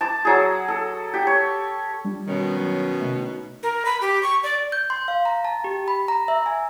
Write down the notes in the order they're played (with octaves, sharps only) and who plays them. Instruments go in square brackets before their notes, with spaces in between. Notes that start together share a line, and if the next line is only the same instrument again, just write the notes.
[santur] A5 D6
F#3 G#4
A4
G4
C#5
[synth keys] G3 D4 F4
[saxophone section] B2 D#3 C#4
[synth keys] F#3 F#4 C#5
C3 A3 E5
D#4
[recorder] A#4
B5
G4
C#6
D5
[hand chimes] G6
C6
F5
A#5
A5
G4
B5
A#5
E5
G#5